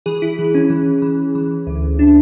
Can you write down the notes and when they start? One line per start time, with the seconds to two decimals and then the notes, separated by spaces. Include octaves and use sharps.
0.06 E3 G#4
0.22 E4
0.39 E3
0.55 C#4
0.70 E3
1.02 E3
1.35 E3
1.67 D2
1.99 D4